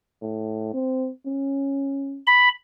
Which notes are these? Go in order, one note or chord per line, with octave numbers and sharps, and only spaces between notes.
A2
C4
C#4
B5